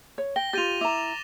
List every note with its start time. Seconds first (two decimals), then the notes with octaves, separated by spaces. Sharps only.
0.18 C#5
0.36 G5 A#6 G7
0.53 F4 G4 A6 D#7 F7
0.81 E4 A#5 D6 E7